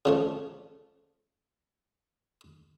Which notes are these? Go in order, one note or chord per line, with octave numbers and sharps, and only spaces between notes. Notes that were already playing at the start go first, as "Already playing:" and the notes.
C#3 F3 A3